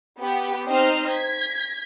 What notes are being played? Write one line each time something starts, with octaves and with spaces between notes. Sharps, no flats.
B3 G4
C4 D#4 C5 D#5 F6 C7
G#6 B6